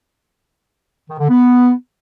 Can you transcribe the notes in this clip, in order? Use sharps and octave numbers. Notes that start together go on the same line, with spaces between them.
D#3
D3
B3